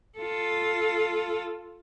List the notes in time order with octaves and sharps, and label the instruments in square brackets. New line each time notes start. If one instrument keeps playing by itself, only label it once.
[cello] F4 A4